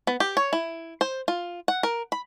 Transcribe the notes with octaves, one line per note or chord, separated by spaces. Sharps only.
B3
G4
C#5
E4
C5
F4
F#5
A#4
B5